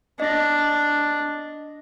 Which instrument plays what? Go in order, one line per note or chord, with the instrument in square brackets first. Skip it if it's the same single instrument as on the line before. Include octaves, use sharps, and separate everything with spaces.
[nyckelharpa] D4 [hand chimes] D#5 A#6